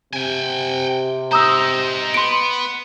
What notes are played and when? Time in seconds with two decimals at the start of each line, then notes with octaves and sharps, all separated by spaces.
0.13 C3 G5 G#5
1.32 D#4 C5 A#5 D#6 E6
2.14 B3 C6 D7